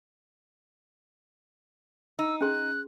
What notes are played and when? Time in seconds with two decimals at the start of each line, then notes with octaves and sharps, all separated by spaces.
2.19 D#4 E6
2.41 C#4 G#4 C6 F#6